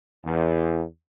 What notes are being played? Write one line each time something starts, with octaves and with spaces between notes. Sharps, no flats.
E2